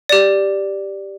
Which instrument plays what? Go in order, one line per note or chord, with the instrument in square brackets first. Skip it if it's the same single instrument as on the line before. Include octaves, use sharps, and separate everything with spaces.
[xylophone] G4 D5